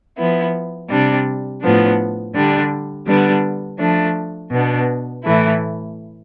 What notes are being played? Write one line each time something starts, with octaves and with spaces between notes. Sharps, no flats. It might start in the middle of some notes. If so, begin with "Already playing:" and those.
F3 B3 E4
C3 G3 D4
A2 F3 B3 D4
D3 G3 D4
D3 G3 B3 D4
F3 A3 D4
B2 B3 D4
A2 E3 A3 E4